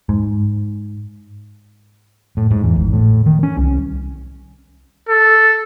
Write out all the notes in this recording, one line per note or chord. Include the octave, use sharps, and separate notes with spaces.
G#2
A2
G#2
E2
G#1
A2
D#3
C#4
C2
A4